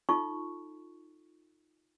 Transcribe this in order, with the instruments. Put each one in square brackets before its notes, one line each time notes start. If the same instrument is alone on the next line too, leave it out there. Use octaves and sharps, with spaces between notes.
[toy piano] D#4 F4 A4 C#6